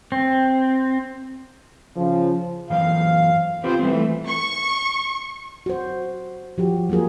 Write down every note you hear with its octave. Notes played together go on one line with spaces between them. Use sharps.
C4
C#3 F3
F#2 E3 C5 F5
C4 F4 G4 B4 C5
E3 G3 A3 C4
A3
C#6
F#4 C5
F3 F#4 G4
F#3 A#3 F4 G#4 A#4